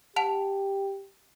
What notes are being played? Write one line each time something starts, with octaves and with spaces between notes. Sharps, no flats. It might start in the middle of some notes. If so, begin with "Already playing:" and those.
G4 F#5 A5 F7